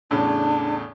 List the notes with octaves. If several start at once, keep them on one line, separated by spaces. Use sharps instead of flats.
E2 A2 C#3 D4